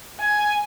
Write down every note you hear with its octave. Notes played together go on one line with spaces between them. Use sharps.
G#5